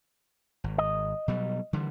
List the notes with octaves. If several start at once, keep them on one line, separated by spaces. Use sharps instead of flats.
G#1
D#5
B2 F#3 G3
D3 E3 G3